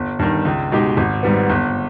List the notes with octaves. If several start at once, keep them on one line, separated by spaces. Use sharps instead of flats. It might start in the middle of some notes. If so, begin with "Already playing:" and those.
Already playing: G1
G2 D#3
C#2
B2 G#3 D#4 G4
G#1
G#2 G3 B3
G1